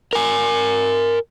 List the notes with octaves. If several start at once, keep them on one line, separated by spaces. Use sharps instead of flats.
A#4 G#5